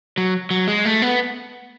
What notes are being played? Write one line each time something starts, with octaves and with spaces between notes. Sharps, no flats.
F#3
F#3
G#3
A3
B3